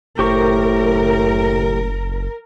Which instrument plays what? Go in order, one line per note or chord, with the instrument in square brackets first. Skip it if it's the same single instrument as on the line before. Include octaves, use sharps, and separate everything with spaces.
[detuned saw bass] F#1 [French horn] A2 [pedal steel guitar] G4 C5 C#6 [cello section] A#4